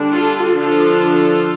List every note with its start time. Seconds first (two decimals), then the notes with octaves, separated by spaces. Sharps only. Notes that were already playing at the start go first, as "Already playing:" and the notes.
Already playing: D3 G3 D4
0.12 F4 A4
0.55 D3 F3 D4 F4 A4